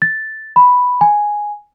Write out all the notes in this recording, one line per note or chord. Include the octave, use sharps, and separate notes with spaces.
A6
B5
G#5